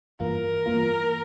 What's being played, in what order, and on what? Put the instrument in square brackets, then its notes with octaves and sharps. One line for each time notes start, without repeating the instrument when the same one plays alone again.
[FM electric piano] G2 E3 A#3 F4 [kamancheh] A#4
[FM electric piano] G2 E3 A#3 F4